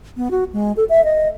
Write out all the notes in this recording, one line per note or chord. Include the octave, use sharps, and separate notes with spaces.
B3
F#4
G#3
A4
E5
D#5